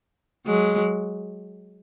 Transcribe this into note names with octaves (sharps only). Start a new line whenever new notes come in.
F#3 G#3